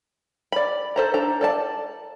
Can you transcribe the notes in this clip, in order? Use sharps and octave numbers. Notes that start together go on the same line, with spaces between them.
D5 B5
A4 C5 A#5
D4 A4 A#5
A4 D5 A5